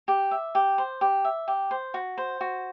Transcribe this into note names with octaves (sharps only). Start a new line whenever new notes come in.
G4
E5
G4
C5
G4
E5
G4
C5
F#4
C5
F#4